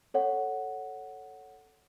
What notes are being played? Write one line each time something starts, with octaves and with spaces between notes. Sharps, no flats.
A4 C#5 F#5